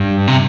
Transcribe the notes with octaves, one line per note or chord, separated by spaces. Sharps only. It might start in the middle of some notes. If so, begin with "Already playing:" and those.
Already playing: G2
C3